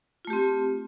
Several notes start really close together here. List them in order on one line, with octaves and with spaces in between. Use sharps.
F4 A3 G4 C4